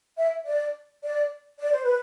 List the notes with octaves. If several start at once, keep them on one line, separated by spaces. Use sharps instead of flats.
E5
D5
D5
D5
C5
B4